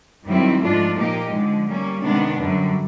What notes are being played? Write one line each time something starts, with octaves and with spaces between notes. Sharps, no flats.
F#2 D#3 G3 C4 E4
G#2 F3 A3 D4 F4
A#2 F3 A#3 D#4 G4
D3 F3 G#3
G3 A#3 C#4
C3 D#3 G#3 B3 D4
F#2 D3 G3